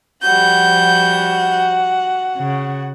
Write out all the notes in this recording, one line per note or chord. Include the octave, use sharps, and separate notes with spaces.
F3 G3 F#4 F#5 G6
C#3